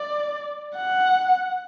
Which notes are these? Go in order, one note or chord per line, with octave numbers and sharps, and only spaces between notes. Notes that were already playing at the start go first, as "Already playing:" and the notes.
Already playing: D5
F#5